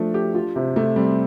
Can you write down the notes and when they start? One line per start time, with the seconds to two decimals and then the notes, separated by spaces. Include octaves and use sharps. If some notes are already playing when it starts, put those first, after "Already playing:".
Already playing: F3 A3 D4
0.14 G4
0.34 F4
0.56 C3
0.76 C3 A3
0.96 G3 C4